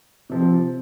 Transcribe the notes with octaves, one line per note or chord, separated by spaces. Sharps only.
C3 F3 C4